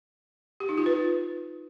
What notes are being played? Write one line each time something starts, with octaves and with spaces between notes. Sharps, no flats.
G4
D#4
F4
B4